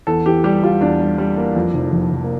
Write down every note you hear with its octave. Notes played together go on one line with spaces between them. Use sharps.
E2 A4
E3 G4
G3 G4
G3 F4
E2 D4
G3
G3
A#3
F2
F1
F1
F1
A#3